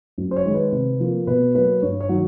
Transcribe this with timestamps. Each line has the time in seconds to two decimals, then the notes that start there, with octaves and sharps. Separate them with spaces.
0.18 F#2
0.31 C5
0.36 C#5
0.45 D#3 G#3
0.54 B4
0.72 C3
1.00 F3 A#3
1.27 B2 B4
1.55 F#3 A#3 B4
1.82 G2 C#5
2.00 C#5
2.09 D#3 F#3